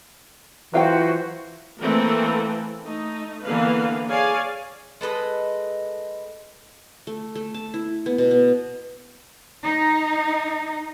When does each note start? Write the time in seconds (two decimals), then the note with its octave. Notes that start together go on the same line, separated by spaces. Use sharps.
0.73 E3 F#3 F4 F#4 C5 F5 G5
1.81 E3 A3 A#3 C4 A4 A#4
2.83 A3 D#4
3.43 D3 E3 A#3 B3 B4 F5
4.09 G#4 C#5 D5 F5 G#5
5.01 G#3 A4 B4 D#5
7.07 A3
7.35 A3
7.54 A5
7.74 E4
8.06 B3
8.18 B2
8.31 B3
9.63 D#4